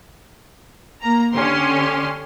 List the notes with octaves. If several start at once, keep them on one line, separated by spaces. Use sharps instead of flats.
A#3 A#5
D3 C#4 G4 C6